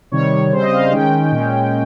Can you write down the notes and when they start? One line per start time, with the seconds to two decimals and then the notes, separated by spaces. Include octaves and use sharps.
0.12 C3 D#3 G3 C#5
0.51 C#3 G3 C4 C5
0.62 D#5
0.72 F5
0.83 F5
0.92 D#3 G#3 C#4 G5
1.32 A#2 G#3 C#4